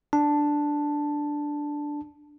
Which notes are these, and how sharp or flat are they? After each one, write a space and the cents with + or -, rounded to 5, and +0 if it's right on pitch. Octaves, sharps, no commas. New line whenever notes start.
D4 +0 A5 +0